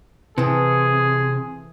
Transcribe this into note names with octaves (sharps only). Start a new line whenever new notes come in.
C3 E3 G#4 A4